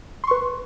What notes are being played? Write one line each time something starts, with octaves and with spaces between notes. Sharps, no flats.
B4 C6 C#6